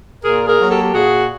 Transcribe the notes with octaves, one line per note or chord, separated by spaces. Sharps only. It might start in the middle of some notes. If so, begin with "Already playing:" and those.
A#2 G#4 A#4
G#4 A#4
F#3 A#3
G4 A4
G4
A#2 F#4 G#4